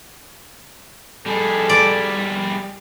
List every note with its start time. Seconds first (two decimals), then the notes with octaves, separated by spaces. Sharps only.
1.26 G3 G#4 A4
1.69 D5